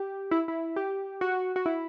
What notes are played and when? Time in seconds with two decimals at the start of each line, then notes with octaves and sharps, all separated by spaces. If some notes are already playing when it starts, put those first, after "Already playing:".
Already playing: G4
0.31 E4
0.48 E4
0.76 G4
1.21 F#4
1.56 F#4
1.66 E4